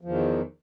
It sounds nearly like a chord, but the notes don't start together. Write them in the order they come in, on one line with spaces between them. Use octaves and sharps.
F3 E2 D#3